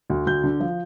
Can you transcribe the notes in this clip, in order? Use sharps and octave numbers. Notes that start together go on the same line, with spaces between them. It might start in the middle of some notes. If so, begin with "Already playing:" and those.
D2
D2 G6
D3
F3